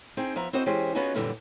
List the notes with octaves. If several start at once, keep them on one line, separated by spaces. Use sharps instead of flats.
C4 D#4 G#4 G5
F3 B3 E5 A#5
C4 E4 F#4 A4 C5 D#5
E3 G#3 C#4 G4 G#4 C5
B3 C#4 D#4 F4 F#4 G#4
F#2 A#2 D3 E3 G3